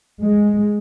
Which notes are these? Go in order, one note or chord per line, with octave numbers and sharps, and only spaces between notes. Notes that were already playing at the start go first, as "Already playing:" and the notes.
G#3